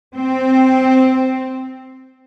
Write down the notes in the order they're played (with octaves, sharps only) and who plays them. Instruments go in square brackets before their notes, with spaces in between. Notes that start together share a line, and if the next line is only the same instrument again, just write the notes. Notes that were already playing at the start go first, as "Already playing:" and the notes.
[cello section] C4